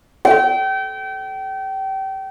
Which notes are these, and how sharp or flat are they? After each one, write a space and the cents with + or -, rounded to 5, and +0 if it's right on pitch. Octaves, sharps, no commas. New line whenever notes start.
G5 -30